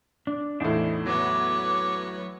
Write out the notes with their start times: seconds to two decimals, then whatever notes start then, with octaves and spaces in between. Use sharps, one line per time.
0.27 D4
0.60 E2 A2 D4 D#4 C5
1.06 F#3 B3 C#5 D6